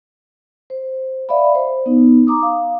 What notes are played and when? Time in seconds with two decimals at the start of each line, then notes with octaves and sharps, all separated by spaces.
0.70 C5
1.29 D5 E5 F5 B5
1.55 C5
1.86 B3 D#4
2.27 A#5 D6 D#6
2.43 F5